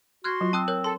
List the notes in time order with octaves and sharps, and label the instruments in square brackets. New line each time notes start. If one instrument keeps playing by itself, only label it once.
[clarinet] F#4 [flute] C6 [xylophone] F6 F#6 G#6
[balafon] F#3 F4
[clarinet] C4 [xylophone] A5 D#6 F#6
[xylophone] A#4 C#5 F#6
[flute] A4 [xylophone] C6